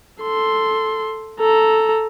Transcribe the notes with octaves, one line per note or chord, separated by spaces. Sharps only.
A4 C6
A4 A#5